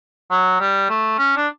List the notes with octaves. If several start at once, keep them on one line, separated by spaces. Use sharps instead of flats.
F#3
G3
A3
C#4
D4